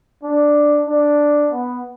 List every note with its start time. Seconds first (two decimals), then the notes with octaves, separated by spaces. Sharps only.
0.24 D4
0.88 D4
1.52 B3